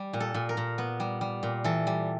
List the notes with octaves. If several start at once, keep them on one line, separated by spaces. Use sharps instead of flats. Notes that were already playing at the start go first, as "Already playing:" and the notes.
Already playing: G3
A#2
A4
A#2
A#4
A#2
B3
G3
G3
A#2
E3 A4
G3